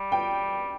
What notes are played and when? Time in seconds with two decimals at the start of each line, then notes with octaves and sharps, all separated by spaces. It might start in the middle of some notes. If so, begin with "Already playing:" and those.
Already playing: G3
0.12 G5